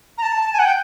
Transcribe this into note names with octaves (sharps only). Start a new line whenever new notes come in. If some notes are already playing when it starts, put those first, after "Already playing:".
A#5
A5
G#5
F#5
G5